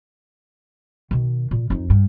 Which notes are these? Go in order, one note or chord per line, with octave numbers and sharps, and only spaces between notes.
B2 D#3
A#2
F2 D#4
G2